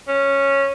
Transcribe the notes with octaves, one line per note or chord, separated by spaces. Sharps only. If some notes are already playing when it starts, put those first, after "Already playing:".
C#4